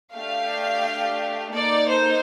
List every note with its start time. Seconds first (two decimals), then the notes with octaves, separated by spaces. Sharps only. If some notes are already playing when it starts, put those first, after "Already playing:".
0.15 A3 D4 G4 F5
1.54 A#3 D#4 A4 D5
1.89 C5